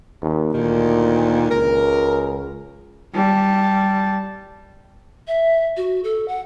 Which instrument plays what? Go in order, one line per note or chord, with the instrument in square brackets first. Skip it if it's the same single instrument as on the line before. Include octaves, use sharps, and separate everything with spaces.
[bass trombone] D#2
[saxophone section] D2 D#3 [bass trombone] A#2
[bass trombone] C#2 [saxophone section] A#4
[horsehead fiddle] G3 A5
[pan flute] E5
F#4
A4
F#5